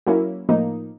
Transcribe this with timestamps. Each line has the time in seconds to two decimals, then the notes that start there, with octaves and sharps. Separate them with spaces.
0.07 F#3 A#3 C#4 E4
0.49 A2 F3 A#3 D#4